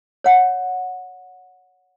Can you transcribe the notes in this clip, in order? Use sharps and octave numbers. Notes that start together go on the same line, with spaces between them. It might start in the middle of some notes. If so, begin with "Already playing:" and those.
C#5 F#5